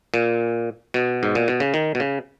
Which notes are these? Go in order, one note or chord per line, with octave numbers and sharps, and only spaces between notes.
A#2
B2
G#2
A#2
B2
C#3
D#3
B2
C#3